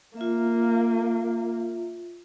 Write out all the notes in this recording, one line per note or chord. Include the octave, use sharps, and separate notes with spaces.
A#3 F4 E5